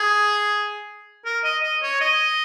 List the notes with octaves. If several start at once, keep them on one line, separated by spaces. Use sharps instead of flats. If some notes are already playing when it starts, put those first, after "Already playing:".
Already playing: G#4
A#4
D#5
D#5
C#5
D#5